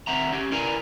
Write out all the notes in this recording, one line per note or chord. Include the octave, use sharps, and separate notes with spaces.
D#3 C4 E5 F#5 A#5
C#4 G4
E4 A#4 B4 D5 G#5 A#5